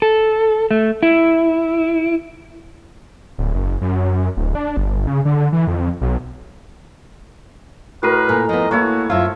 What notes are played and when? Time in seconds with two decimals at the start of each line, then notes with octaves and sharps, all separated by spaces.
0.02 A4
0.71 A3
1.03 E4
3.38 D1
3.55 F#1
3.81 F#2
4.37 D1
4.55 D4
4.77 G1
5.07 C#3
5.25 D3
5.52 E3
5.67 F2
6.01 B1
8.03 A2 F#4 A#4 B4 C7 D#7
8.29 A#2 A4 G#5 A#5
8.49 F3 B3 D#5
8.71 A#3 E4 F#4 C#5 A5
9.10 F#2 F3 F4 E5 F6